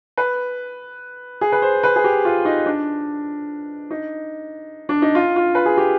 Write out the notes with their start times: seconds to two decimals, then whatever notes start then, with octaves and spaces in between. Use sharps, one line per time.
0.17 B4
1.41 G#4
1.52 B4
1.62 C5
1.83 B4
1.96 G#4
2.04 G4
2.25 F4
2.45 D#4
2.66 D4
3.90 D#4
4.89 D4
5.02 D#4
5.15 F4
5.36 F4
5.55 B4
5.66 G#4
5.77 G4